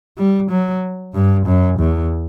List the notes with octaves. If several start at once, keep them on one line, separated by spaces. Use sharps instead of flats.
G3
F#3
G2
F#2
E2